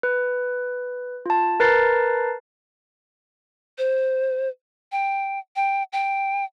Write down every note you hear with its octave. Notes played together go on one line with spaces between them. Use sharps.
B4
F4 A5
A#4 B4 A5 A#5 A6 C7
C5
G5
G5
G5